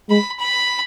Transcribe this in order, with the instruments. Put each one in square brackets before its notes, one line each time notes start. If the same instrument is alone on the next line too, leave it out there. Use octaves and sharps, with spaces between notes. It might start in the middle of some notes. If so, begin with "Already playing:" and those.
[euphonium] G#3 [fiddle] B5
[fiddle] B5